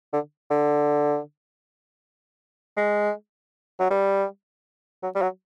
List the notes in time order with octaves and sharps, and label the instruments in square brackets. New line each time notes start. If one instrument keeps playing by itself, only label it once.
[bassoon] D3
D3
G#3
F#3
G3
F#3
G3
F#3